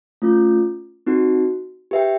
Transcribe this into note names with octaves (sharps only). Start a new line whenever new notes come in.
A3 C#4 F4
C4 D#4 F#4
G4 B4 E5 G5